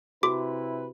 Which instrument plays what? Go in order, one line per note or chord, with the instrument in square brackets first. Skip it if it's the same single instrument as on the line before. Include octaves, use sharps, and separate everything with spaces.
[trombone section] C3 E4 B4 [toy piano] F#4 [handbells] D6